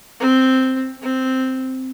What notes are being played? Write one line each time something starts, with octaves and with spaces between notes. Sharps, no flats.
C4
C4